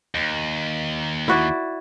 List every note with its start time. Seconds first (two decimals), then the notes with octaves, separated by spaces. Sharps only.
0.15 D#2
1.28 E4 F#4 D5